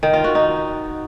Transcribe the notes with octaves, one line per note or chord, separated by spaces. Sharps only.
D#3
F4
F#4
D#4